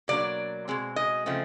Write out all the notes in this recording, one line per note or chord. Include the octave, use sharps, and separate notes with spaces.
B2 F#3 A#3 D4 D5
B2 G#3 C4
D#5
C#3 F3 A3 C4